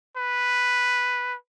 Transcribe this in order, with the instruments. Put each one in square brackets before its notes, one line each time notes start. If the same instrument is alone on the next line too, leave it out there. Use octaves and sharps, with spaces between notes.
[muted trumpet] B4